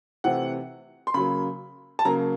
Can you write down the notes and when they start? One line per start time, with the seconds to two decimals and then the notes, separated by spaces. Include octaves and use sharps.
0.24 C3 E3 A3 C4 F#5
1.07 C6
1.14 C#3 F#3 A#3 B5
1.99 A5
2.05 C#3 F#3 A#3 A#5